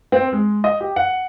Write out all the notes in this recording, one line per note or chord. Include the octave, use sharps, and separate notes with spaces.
C4
G#3
D#5
G4
F#5